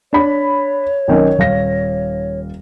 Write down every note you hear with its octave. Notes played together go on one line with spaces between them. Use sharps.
D4 C#5 B5
B1 D#3 C#4
D#1 F5 A#6